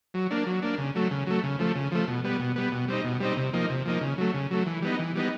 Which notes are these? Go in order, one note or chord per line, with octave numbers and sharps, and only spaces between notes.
F#3
A#3 D4
F#3
A#3 D4
C#3
F#3 A3
C#3
F#3 A3
C#3
F3 A3
C#3
F3 A3
B2
G3 B3
B2
G3 B3
B2
G3 C4 D#4
B2
G3 C4 D#4
C3
F3 A#3 D#4
C3
F3 A#3 D#4
C#3
F#3 A3
C#3
F#3 A3
E3
G3 B3 D#4
E3
G3 B3 D#4